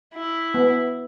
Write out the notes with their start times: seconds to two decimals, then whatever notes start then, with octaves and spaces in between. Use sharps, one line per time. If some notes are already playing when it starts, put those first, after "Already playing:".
0.14 E4
0.54 B3